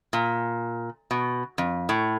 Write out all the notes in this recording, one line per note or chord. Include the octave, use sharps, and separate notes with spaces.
A#2
B2
F2
A2